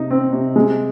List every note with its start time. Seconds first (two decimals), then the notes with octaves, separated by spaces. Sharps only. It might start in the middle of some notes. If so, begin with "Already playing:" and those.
Already playing: C3 D#4
0.11 C4
0.33 C3
0.56 G#3